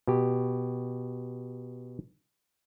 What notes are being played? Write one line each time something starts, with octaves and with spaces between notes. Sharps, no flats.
B2 G4